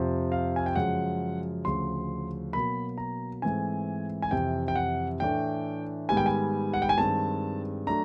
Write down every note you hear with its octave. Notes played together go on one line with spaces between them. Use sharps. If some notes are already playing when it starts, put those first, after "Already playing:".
Already playing: F2 C3 F3
F5
G#5
G5
F#2 C#3 F3 G#3 F#5
D2 C#3 F3 C6
B2 F#3 A#3 B5
A#5
G#2 E3 A3 C4 G#5
G#5
F2 C3 E3 G5
G5
F#5
A2 E3 A3 D4 G5
G#2 D#3 G3 B3 G#5
G5
G#5
F#5
G5
G#5
G2 D#3 G#3 C4 A5
F#3 A3 D4 A#5